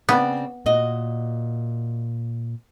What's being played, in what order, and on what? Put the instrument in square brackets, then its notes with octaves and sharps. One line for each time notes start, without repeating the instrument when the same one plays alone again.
[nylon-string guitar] C#3 C4 D5 [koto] B3
[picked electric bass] A#2 [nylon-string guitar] F#4 D#5